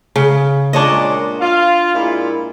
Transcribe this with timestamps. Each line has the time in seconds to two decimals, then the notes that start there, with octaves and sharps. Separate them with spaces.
0.16 C#3
0.73 A#2 G#3 D4 C#5 D#5
1.39 F4 F5
1.93 A#2 G#3 E4